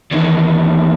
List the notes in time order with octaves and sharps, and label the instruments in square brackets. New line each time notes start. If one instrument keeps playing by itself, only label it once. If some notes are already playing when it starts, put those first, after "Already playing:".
[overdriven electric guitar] E2 D#3